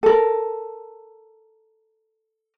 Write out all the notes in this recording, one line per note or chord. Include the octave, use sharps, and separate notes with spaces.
A4 A#4